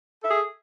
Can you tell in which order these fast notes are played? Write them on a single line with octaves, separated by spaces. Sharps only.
A4 E5 G#4